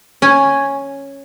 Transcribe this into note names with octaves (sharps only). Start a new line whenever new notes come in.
C#4 G#5